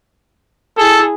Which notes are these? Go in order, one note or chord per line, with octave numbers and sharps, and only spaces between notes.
E4 G#4 A4